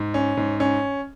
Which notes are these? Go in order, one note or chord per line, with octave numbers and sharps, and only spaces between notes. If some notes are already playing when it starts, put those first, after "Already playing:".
Already playing: G#2
C#4
G#2
C#4